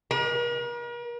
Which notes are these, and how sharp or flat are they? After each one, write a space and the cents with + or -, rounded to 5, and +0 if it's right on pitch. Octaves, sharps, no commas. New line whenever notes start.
A#4 +45